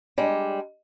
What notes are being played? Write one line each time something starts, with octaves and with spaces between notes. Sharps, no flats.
G3 G#3 D4